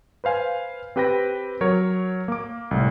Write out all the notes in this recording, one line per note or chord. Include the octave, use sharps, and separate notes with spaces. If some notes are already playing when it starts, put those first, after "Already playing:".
B4 C5 F5 G#5
C4 G4 B4 G5 B5 A#6
F#3 A#4 C#5
A#3 D6
C2 A2